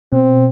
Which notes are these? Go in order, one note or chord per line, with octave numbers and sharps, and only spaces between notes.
B2 C4